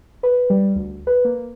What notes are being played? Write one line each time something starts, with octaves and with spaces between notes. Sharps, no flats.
B4
G3
D2
B4
A#3